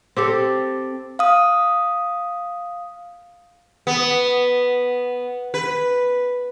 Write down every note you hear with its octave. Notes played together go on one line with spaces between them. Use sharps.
C4 G4 A4
F5 D#6
B3
B4